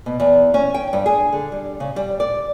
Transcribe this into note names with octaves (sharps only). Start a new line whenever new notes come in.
B2
E2
C#4
G5
G2
G#4
D3
G3
C#3
G3
D5